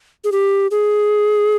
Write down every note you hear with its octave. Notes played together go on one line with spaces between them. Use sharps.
G#4
G4
G#4